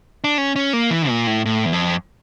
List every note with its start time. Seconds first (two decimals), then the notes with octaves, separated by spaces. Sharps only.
0.24 D4
0.38 C#4
0.56 C#4
0.73 A#3
0.91 E3
1.09 A#2
1.27 A2
1.45 A2
1.66 E2
1.73 F2